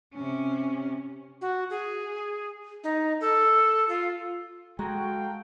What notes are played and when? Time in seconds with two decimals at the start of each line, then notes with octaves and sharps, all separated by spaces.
0.14 C3 C#4
1.41 F#4
1.70 G#4
2.84 D#4
3.21 A4
3.89 F4
4.79 G#3 F#4 A4 F5 G5 A#5